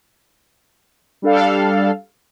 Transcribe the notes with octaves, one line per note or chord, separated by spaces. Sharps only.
G3 D4 A4 F5